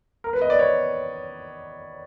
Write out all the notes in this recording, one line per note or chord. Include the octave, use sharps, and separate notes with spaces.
A#4
B4
D#5
D5
C#5